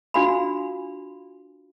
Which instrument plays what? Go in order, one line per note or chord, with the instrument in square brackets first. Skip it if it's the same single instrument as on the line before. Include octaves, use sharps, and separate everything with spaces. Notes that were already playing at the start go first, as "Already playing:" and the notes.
[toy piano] D4 F4 F#4 F5 G#5 B5